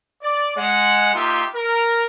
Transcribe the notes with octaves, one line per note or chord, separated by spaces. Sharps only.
D5
G#3 F#5
A#3 D#4 F4 G4 E5 C6
A#4